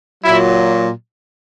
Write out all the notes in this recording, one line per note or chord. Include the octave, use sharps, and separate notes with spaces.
A#2 F#3 E4